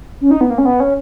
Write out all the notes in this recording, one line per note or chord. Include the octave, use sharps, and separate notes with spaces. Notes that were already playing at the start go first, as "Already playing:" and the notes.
C#4
D#4
B3
A#3
C#4
B3
C#4